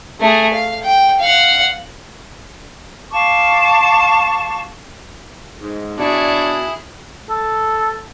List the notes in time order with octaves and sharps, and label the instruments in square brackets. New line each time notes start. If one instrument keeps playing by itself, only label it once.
[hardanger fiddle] A3 G#4
F5
G5
F5 F#5
[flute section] F5 A5 C#6 D6
[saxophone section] G#2
[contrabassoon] B2 [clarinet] D4 [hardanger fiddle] E4 G#4 [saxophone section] C#5 D5
[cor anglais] A4